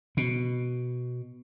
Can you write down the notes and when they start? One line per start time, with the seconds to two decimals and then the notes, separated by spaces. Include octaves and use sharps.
0.17 B2